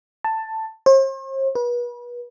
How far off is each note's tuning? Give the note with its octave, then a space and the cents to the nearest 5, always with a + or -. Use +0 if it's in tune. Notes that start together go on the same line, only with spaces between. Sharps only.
A5 +10
C5 +45
B4 -35